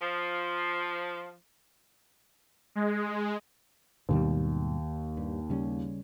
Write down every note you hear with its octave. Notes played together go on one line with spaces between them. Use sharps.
F3
G#3
D#2 G#2 B2 G3
G2
C#3 G3 C#4